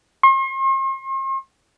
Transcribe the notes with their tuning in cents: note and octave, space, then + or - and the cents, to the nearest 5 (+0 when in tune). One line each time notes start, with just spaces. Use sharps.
C6 +45